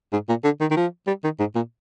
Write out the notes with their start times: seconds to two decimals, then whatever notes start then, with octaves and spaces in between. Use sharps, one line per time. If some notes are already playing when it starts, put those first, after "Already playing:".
0.13 G#2
0.29 A#2
0.44 D3
0.61 D#3
0.71 D#3
0.77 F3
1.07 G3
1.24 D#3
1.39 G#2
1.55 A#2